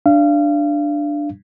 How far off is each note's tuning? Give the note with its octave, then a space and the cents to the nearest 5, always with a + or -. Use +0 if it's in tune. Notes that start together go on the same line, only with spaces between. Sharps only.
D4 +5 F5 -30